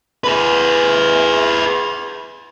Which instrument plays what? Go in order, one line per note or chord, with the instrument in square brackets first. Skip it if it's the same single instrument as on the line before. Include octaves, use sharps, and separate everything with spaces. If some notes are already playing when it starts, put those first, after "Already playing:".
[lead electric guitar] G#4 B4